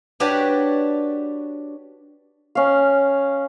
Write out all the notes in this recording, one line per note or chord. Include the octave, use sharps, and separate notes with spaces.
D4 F#4 G4 B4 C#5 D5
C#4 F5